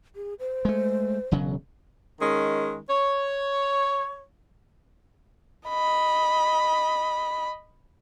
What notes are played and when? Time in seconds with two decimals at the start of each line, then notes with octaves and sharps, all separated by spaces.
0.16 G#4
0.39 C5
0.65 G#3 A3
1.31 E1 C#3 F#3
2.21 D#3 G#3 C#4
2.90 C#5
5.69 D#5 B5